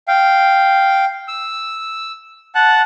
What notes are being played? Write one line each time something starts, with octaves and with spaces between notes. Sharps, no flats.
F5 G5
E6
F#5 A5 F#6